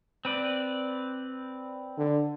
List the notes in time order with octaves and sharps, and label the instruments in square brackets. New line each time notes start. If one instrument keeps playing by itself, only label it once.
[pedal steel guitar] C4 B4 D5
[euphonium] D3